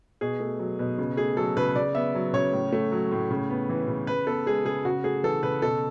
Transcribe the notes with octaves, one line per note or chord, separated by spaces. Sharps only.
B2 G#4
A3
F#3
B2
C#3
A3 G#4
F#3 A4
C#3 B4
C#3 D5
B3 E5
F#3
C#3 C#5
A2
A3
F#3
A2
C#3
B3
E3
C#3
C#3 B4
B3 A4
G#3 G#4
C#3 G#4
C#3 F#4
A3 G#4
E3 A4
C#3 B4
B2 A4